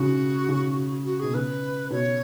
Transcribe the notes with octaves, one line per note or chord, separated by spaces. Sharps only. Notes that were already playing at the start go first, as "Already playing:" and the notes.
Already playing: C#3 F#4
C#3
F#4
B2 G#4
C#3 B4
B2 C#5